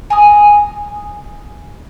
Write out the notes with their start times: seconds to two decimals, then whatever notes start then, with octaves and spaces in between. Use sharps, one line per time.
0.10 G#5 A#5 D#6